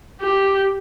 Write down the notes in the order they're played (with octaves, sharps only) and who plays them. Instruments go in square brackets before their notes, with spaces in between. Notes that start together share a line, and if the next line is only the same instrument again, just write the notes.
[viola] G4